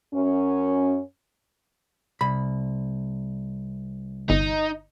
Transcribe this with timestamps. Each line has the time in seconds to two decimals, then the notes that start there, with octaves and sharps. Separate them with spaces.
0.13 F#2 C#4
2.21 C2 B5
4.30 G1 D#4